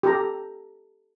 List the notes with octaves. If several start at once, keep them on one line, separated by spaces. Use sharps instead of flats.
G4 A4 A#5